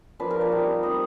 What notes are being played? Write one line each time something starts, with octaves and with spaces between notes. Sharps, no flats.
F3 A#3 D4 B4
A#4
D5
G3 C4 D#4
G3 C4 D#4 D#5